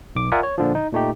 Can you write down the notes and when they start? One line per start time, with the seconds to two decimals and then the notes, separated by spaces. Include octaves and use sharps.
0.15 B1 D6
0.32 F4 A#4 D5 E5 F#5 G#5
0.43 C#5
0.58 A#2 D3 F3
0.75 D#4
0.93 A#2 A3 D#4 G4